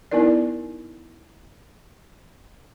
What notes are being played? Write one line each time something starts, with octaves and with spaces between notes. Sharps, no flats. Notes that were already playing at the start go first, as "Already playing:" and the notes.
B3 D#4 E4 A#4 D5